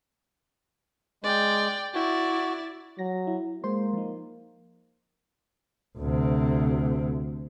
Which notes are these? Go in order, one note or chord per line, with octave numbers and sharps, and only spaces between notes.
G#3 D5 G5
E4 F#4 D5
F#3 A#6
E4
G#3 A#3 C5 C6
F3 D#4
D2 C3